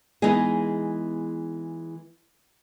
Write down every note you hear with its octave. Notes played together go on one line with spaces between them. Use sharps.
E3 G#3 B3 D#4 G#4